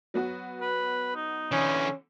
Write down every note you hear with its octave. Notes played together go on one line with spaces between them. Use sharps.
F#3 B3 F#4
B4
D#4
D3 E3 C#4